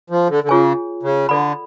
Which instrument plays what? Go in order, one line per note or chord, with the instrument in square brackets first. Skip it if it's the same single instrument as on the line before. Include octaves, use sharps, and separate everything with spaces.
[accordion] F3
D3
D3
[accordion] C#3 [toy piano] F4 G#4 C#5 G#5
[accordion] C#3
[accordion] D3 [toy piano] A4 D5 F#5 B5